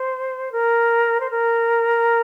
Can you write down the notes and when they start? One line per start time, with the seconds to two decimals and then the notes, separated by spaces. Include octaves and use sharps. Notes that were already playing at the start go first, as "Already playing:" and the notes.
Already playing: C5
0.52 A#4
1.20 C5
1.30 A#4